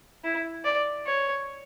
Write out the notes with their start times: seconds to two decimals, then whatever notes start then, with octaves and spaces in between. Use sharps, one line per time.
0.24 E4
0.64 D5
1.06 C#5